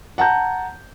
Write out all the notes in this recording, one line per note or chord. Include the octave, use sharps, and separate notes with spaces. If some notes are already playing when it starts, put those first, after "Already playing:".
F#5 A5 A#5 G6